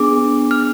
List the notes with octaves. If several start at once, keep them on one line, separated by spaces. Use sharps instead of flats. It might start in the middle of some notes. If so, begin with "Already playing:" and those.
Already playing: B3 D4 G#4 D6
F6